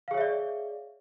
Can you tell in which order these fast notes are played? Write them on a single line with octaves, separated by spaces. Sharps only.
F5 G#4 C#5 E5 D5